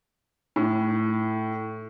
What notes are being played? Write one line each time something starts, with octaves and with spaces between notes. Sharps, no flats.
A2